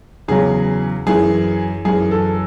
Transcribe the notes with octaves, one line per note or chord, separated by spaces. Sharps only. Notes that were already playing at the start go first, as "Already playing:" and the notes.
E2 C#3 F#3 G#4
F#2 E3 G#4
F#2 E3 G#4
A4